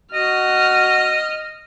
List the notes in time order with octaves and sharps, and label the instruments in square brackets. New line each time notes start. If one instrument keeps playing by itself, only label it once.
[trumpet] F#4 [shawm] D#5 [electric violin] F6